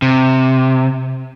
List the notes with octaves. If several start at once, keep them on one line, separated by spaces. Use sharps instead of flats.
C3